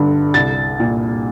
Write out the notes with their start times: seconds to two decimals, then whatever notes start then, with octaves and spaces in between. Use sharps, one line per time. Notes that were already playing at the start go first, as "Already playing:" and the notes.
Already playing: G1 G2 D3
0.34 C2 A6
0.80 A#2